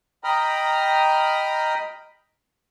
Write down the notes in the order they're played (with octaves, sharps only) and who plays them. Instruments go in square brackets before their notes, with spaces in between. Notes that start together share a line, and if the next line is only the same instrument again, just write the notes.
[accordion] D#5 G5 A#5 B5 D#6 F6